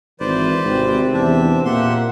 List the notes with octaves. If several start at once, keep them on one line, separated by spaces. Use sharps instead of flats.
G#1 E3 B4 C5 D5
G#1 C3 C4
E2 D4 E5
A#2 A#3 G4 E5 F#5 C6